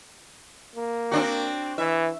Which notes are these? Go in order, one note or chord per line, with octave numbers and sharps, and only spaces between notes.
A#3
C4 D4 F#4
E3 E5